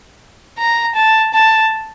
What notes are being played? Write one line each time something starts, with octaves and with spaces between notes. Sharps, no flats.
A#5
A5
A5